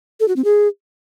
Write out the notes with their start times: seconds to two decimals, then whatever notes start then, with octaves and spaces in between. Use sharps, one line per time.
0.20 A4
0.28 F#4
0.36 C4
0.44 G#4